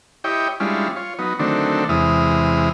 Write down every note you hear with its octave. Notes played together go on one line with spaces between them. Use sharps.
E4 G4 C#5 D#5 G5
G3 G#3 C#4 D4 E4 F4
F4 C#5
F#3 B3 D#4
D3 D#3 F#3 A3 C4 D4
E2 C3 G#3 E4 D#6 F6